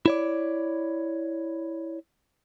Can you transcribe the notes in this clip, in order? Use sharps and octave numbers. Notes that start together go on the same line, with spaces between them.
E4 C#5 D5